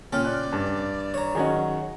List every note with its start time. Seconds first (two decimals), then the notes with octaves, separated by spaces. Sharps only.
0.13 A#2 C#3 A4 G5 F6
0.25 D5 F#6
0.53 G2
1.14 C#5 A#5
1.35 D#3 F#3 C#4 G#4 D#5 F#5